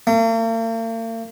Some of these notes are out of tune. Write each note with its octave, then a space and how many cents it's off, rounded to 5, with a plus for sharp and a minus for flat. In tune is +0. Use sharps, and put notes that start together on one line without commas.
A#3 -45